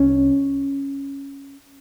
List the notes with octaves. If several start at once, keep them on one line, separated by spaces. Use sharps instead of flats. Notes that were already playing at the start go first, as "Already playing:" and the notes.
Already playing: C2 C#4